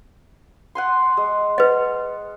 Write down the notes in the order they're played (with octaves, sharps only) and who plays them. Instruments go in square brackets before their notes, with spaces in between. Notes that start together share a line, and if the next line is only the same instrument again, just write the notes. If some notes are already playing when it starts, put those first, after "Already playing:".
[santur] F#5 G#5 C6
G#3
[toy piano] B4 D#5 [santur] F#5